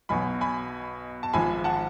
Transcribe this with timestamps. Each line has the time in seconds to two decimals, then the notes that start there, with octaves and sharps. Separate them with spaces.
0.09 B1 B2 F#3 G#5 B5
0.41 G#5 B5
1.23 A5
1.33 G#1 G#2 F3 G#5 B5
1.64 F#5 A5